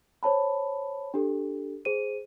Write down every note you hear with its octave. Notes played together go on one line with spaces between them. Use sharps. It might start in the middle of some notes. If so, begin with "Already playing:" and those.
C5 C#5 A5 B5
D4 G4 A4
G#4 C5 D#7